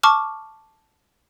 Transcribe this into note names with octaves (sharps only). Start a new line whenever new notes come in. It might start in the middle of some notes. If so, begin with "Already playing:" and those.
A5 C#6 D6 F6